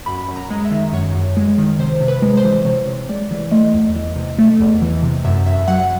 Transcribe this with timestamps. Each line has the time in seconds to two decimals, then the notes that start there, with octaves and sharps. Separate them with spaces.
0.06 F#2 B5
0.28 F#2
0.36 A#5
0.50 G#3
0.65 E5
0.71 D#3
0.93 F#2 C#5
1.15 F#2
1.37 G#3
1.58 D#3
1.79 C3 C5
2.01 C3
2.08 B4
2.22 G#3
2.37 C5
2.45 E3
2.65 C3 C#5
2.87 C3
3.09 G#3 D5
3.31 E3
3.52 A3 D#5
3.74 E2
3.95 E3
4.16 C3
4.39 A3
4.60 E2
4.82 E3
5.03 C3
5.25 F#2 E5
5.46 F#2 E5
5.68 F#3 F#5
5.79 F#5